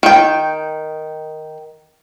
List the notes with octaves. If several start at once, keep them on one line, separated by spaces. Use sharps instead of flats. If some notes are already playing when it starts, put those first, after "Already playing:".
D#3 G5